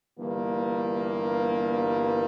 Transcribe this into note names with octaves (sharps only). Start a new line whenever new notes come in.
G1 G2 E3 A#3